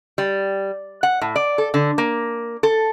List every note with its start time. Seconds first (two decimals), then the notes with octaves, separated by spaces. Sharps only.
0.18 G3
1.03 F#5
1.21 A2
1.36 D5
1.58 A4
1.74 D3
1.98 A#3
2.63 A4